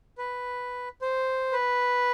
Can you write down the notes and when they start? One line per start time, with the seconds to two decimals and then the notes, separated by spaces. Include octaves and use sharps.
0.18 B4
1.02 C5
1.52 B4